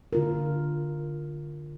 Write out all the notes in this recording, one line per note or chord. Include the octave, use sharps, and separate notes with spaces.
D3 F4 A#4